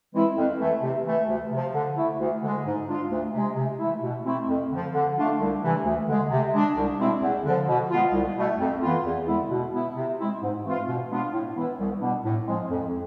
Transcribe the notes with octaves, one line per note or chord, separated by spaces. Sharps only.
E3 G#3 C4 E4
F2
E3 A3
C3
E3 A3
D2
C3 F3
D3
A3 E4
D2
D3 G#3
G#2
G#3 D4 F4
D2
C3 G#3
C3
E3 A3 E4
B2
A3 C4 E4
F2
D3 F3
D3
A3 D4 F4
C2
C3 E3 A3
D2
D3 G#3
C3
G#3 D4
C2
B2 G#3 C4 E4
E2
D3 F3
B2
G#3 B3 F4
C2
B2 A3
F2
E3 B3 F4
E2
D3 G#3 B3 E4
B2
B3 E4
C3
G#3 C4 E4
G#2
E3 A3 C4 F4
B2
G#3 B3 D4 F4
A2
E3 B3 E4
C2
B2 B3 D4
A2
F3 G#3 C4
F2